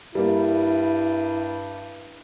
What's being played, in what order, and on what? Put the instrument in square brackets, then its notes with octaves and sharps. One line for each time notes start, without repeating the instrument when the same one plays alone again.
[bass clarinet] G2 [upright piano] G3 A#3 [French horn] E4